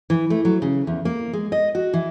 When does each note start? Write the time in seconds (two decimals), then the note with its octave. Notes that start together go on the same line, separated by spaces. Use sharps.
0.10 E3
0.30 A3
0.45 F#3
0.62 C#3
0.87 E2
1.05 A#3
1.33 G#3
1.52 D#5
1.75 F#4
1.93 E3